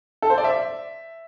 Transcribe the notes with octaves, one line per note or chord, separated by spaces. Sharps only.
A4
C5
D5
E5